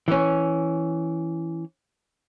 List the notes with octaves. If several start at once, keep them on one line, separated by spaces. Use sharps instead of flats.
E3 C#4